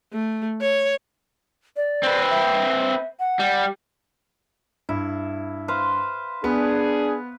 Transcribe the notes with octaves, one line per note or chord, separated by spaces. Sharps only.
A3
C#5
D5
C4 B4
E5
F#5
G3
G2 E4
B4 C5 F5
B3 D4 G#4 B4